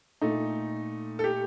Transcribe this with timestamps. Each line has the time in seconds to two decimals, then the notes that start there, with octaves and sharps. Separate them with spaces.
0.22 A#2 A3 D#4
1.19 A4
1.24 G4